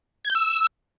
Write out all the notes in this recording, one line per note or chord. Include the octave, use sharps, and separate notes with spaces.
G#6
G6
E6